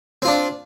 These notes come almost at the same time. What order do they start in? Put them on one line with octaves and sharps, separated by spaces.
C4 F4 D4